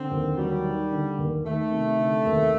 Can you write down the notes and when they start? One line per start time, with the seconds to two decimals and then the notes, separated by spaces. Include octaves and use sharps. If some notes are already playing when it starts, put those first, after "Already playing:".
Already playing: D3 C4
0.11 D#2
0.38 F#3 G3
0.65 D#3
0.92 D3
1.18 D#2
1.45 D#3 A3
1.72 C3
1.99 D3
2.26 D#2